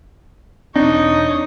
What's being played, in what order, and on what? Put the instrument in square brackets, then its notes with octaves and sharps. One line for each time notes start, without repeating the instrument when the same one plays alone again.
[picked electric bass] E1 C4 [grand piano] D4 [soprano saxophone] D#4 [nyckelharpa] C#5 D#6